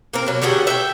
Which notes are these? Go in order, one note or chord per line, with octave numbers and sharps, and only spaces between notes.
A#3 C4 A#4
B2 F#3
D3 G3 F#4 G#4
E5 F#5 G5